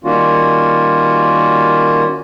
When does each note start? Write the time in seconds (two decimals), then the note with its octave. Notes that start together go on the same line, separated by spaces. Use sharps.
0.04 D#3 G3 A#3 C#4 F4 F#4